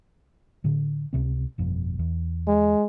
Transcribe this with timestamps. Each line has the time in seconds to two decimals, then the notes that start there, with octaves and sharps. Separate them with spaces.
0.64 A2 D3
1.13 C#2 C3 C4
1.58 G1 F2 B2
1.99 E2
2.47 G#3